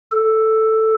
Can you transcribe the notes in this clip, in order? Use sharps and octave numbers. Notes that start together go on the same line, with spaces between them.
A4